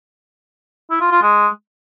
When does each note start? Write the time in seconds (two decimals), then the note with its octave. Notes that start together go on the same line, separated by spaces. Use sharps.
0.90 E4
1.01 F4
1.11 F4
1.22 G#3